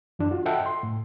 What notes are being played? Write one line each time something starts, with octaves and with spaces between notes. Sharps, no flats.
F#2 E3 D4
F4 F#4
A4 D#5 E5 F#5 G5 A5
C6
A2